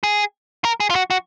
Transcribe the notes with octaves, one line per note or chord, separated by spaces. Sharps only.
G#4
A#4
G#4
F4
F#4
F#4